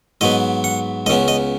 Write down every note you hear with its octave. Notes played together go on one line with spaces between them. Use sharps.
G#2 F#3 B3 D#5
F#5
C#2 C#3 B3 D#5
D#5